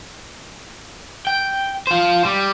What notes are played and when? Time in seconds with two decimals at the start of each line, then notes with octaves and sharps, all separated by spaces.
1.27 G5
1.87 F4 C5
2.25 G3